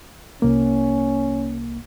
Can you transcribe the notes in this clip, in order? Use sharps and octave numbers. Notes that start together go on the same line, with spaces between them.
C2 A#3 C#4